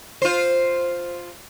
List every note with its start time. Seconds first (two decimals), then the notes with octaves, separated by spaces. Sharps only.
0.22 F4 C5